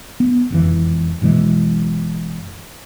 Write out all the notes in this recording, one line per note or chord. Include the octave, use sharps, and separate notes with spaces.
B3
E1 F2 E3
F#1 B2 E3 G#3